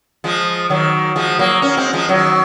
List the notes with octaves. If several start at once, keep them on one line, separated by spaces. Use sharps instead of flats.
F3 G#3
D#3 F#3
F3 G#3
F#3 A#3
A#3 C#4
G#3 C4
F3 G#3
D#3 F#3